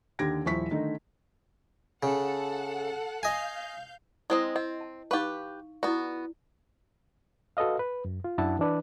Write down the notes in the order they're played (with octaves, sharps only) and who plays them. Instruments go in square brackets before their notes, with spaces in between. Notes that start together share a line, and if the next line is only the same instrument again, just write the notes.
[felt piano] D#2 D3 G4 G#6 A#6 D7
D#1 F3 E4 C#6 B6
D3 D#3 A3 D#4
[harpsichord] C#3 [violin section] A4 F#5
[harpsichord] D#5 G#5 [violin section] F5 G6
[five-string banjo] G#3 C4 D#5 [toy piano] E4 C5
[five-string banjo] C4 [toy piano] D#5
[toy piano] A5
[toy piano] D#4 F5 C#6 [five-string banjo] G4 B4
[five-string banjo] B3 F#4 [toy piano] E4 D5
[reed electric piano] F#4 A4 B4 D#5 F5
B4
F#2
F4
F#2 D4 E4 F#5 A5
E3 D4 B4